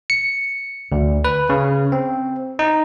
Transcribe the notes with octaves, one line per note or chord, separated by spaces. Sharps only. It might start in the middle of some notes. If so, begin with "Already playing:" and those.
C#7
D2
B4
C#3
C4
D#4